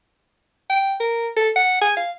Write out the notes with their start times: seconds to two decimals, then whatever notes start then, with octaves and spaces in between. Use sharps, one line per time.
0.70 G5
1.00 A#4
1.37 A4
1.56 F#5
1.81 G#5
1.97 F5